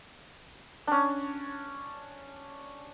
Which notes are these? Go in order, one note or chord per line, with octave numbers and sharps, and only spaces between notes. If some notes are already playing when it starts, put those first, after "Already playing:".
C#4 D4